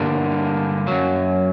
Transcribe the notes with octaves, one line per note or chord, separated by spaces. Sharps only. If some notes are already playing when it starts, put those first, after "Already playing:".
Already playing: G2 D3 G3 A#3
F#2 F#3